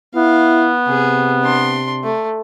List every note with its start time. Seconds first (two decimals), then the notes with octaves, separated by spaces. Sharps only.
0.15 B3 E4 F5
0.89 C3 G#4
1.43 D4 C6
2.04 A3